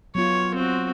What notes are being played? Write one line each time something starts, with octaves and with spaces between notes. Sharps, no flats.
F#3 B3 F4 C#5
C4 F#4